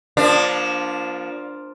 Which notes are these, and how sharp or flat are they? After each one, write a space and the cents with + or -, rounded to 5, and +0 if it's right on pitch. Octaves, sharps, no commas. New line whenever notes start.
F3 +0 A#3 +35 D4 +0